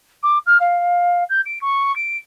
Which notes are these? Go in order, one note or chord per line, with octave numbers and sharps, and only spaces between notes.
D6
F6
F5
G6
D7
C#6
D7